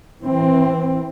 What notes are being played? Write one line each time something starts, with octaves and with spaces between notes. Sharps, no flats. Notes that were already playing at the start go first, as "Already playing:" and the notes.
E3 C4